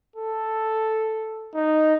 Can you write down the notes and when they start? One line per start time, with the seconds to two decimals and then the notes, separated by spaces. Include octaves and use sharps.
0.16 A4
1.55 D#4